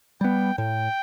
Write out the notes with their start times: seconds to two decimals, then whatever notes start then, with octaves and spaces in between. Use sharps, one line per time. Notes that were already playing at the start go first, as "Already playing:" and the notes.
0.21 G3 B3 G5
0.57 A2 G5